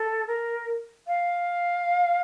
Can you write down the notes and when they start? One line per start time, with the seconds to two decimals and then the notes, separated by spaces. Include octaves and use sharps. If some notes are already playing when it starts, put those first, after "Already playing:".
Already playing: A4
0.27 A#4
1.07 F5